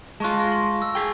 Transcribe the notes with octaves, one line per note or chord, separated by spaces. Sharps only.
G#3 F4 A5 C#6 F#6
A#6
C6
E6
G#4 G5